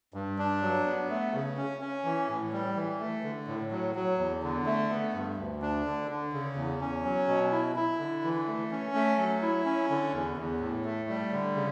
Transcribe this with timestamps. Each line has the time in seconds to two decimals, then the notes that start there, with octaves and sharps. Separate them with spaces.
0.14 G2
0.38 D4
0.62 F#3
0.86 B3
1.09 A3
1.34 C#3
1.57 C#4
1.81 C#4
2.05 E3
2.29 A2
2.53 G3
2.76 E3
3.00 A3
3.24 D3
3.48 A2
3.71 F#3
3.95 F#3
4.19 E2
4.43 D3
4.66 A3
4.90 B3
5.14 G2
5.37 D2
5.62 D4
5.85 D3
6.09 D3
6.33 C#3
6.56 E2
6.81 C#4
7.04 F#3
7.28 B2
7.52 E4
7.76 E4
7.99 D3
8.24 E3
8.47 A3
8.71 C#4
8.95 A3
9.18 F#3
9.42 E4
9.65 C#4
9.90 D3
10.14 E2
10.37 E2
10.60 A2
10.85 A3
11.09 G3
11.32 D3
11.56 C#3